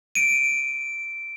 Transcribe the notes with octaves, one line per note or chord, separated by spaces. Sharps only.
D7 D#7